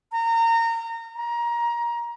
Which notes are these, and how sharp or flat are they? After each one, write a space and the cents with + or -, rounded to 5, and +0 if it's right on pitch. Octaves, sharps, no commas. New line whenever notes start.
A#5 -25
A#5 +20